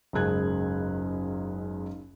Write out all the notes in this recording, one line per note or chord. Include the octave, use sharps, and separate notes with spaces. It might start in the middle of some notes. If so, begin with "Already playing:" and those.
F#1 C#2 G#2 G#4 F#6 G#6